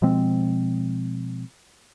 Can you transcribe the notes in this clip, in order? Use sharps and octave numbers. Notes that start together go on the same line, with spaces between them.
B2 F3 G#3 C4